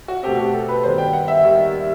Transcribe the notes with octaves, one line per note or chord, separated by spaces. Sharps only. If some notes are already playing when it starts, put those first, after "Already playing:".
F#4
B2 A3 C4 G4
F#4
G4
A4
B4
G2 D#3 G3 B3 C5
G5
F#5
E5
D#2 D#3 G3